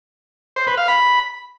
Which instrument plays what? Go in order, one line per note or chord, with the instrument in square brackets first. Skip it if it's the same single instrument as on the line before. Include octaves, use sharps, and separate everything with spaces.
[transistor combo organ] C5
B4
F5
B5